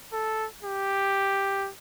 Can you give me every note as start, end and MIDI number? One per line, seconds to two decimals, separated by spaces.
0.13 0.47 69
0.64 1.70 67